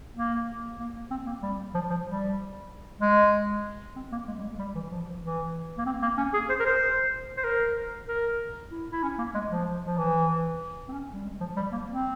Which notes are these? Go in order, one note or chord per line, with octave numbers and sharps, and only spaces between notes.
A#3
A#3
C4
A#3
G3
F3
F3
G3
G#3
C4
A#3
G#3
G3
G#3
G3
E3
F3
E3
A#3
C4
A#3
C#4
G#4
C5
A#4
C5
C5
A#4
A#4
E4
E4
C#4
A#3
G#3
F3
F3
E3
C4
C#4
G3
G#3
F3
G3
A#3
C4